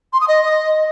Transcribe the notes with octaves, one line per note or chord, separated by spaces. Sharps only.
C6
D#6
D#5